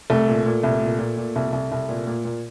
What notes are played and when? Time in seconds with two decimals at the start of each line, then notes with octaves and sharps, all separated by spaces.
0.10 C2 A3
0.27 A#2
0.46 A#2
0.63 C2
0.81 A#2
0.99 A#2
1.17 A#2
1.36 C2
1.53 C2
1.72 C2
1.89 A#2
2.07 A#2
2.25 A#2